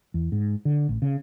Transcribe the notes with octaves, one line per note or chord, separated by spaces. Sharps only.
E2
G#2
D3
A1
C#3